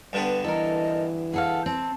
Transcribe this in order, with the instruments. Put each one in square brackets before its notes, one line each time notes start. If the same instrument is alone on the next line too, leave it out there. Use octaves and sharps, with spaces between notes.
[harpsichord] G2 D3 B3
[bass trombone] E3 [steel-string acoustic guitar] A4 A#4 [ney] D#5
[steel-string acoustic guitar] G#4 A4 F5 [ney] F#5
[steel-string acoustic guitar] C4 [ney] A5